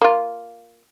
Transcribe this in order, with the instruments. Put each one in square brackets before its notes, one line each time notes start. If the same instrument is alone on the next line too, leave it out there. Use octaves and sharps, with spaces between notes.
[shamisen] A#3 F4